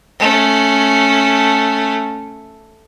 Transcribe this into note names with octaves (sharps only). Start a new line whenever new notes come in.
A3 C#4